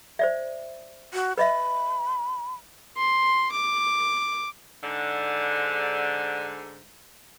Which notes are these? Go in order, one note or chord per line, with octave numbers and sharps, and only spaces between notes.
C5 D5 E5
F#4
B4 D#5 E5 B5
C6
D6
G#2 D3